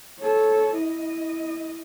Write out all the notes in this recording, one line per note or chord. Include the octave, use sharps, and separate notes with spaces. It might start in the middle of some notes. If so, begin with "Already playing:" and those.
A4 C#5
E4 D#5